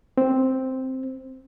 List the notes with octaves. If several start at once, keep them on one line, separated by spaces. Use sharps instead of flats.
C4